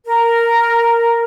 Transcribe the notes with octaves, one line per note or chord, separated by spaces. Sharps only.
A#4